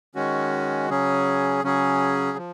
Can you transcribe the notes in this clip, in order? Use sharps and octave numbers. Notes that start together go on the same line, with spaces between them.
D#3 G#3 C#4 F#4
C#3 F#3 C#4 G#4
C#3 F#3 C#4 G#4
F3